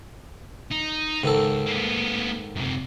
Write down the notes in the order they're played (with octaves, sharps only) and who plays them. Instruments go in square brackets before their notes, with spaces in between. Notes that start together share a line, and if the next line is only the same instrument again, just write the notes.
[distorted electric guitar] D#4
[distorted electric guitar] C#2 [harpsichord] G#2 D#3 A4
[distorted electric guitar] A#3 B3
F#2 C3